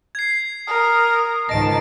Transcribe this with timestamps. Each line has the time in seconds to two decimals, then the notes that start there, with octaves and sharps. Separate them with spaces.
0.15 G#6 C7
0.67 A#4 D#6
1.49 C#2 G#2 D#3 D#5 A5 A#6 D7